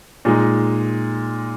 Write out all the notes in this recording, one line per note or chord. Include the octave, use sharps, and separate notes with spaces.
A#2 G#3 D#4